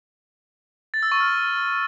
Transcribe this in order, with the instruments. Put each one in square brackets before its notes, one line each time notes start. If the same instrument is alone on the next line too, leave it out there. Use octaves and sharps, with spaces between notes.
[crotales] A6
E6
C#6
F6